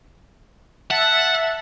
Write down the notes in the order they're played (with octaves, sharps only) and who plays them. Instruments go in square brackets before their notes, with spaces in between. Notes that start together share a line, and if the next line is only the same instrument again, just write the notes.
[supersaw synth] E5 A5 [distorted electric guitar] F#5